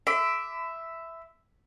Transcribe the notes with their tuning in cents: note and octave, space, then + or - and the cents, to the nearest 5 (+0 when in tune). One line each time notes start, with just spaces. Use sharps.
E5 +0 B5 +40 D6 +0